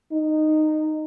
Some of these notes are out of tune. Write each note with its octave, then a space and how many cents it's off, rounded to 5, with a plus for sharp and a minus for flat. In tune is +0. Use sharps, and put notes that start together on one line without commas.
D#4 -15